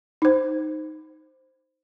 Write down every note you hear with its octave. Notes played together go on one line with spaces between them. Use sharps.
D#4 C5